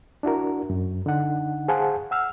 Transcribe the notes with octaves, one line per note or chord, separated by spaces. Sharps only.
D4 E4 F#4 A#4
F#2
D3 D#4 F#5
G#4 C5 F5 F#5 G#5 A5
F#5 E6 F6